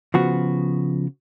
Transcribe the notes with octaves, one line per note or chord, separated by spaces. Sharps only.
C#3 F3 B3 F#4